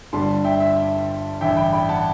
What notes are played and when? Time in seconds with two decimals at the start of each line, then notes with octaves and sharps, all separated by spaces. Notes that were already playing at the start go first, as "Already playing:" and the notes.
0.13 G1 G2 D3 G3 A5 C6
0.44 E5 G5
0.60 E5
0.77 E5
1.41 A1 G2 D3 E5 G5
1.57 G5 B5
1.73 G5 B5
1.89 F#5 A5